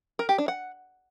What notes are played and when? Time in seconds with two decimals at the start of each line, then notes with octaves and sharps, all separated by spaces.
0.19 A#4
0.29 G4
0.38 D4
0.48 F#5